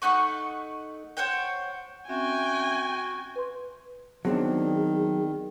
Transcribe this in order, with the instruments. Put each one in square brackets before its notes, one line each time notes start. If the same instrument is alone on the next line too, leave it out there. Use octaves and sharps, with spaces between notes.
[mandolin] A3 D#4 F#5 C#6
C5 C#5 F#5 G5
[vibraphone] C4 C#4 E5 [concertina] F#4 [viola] G5 G#5
[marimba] B4 C6
[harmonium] D#3 [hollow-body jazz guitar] F#3 C4 D4 [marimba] B3 [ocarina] G#4